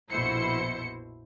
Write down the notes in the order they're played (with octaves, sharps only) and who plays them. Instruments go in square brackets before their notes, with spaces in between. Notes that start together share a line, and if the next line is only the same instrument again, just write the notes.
[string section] A#1 F2 B2 E4 C5 C#7